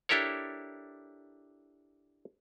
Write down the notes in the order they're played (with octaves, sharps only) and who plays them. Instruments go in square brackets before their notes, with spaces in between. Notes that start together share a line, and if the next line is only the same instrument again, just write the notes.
[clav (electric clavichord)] D4 E4 G4 A4 A#4 C#5